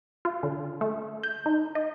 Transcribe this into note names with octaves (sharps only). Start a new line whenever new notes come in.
F4
D3
A3
G6
D#4
D#5